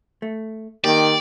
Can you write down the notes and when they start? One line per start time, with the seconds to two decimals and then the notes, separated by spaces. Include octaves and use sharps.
0.22 A3
0.84 D#3 A#3 G4 D5